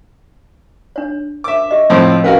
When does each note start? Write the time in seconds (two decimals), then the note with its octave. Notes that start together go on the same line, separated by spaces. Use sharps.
0.96 D4 C#5
1.44 E5 D6
1.71 G4 D#5
1.90 A2 F3 C4
2.24 C#4 F#4 A#4 B4 F5 G#5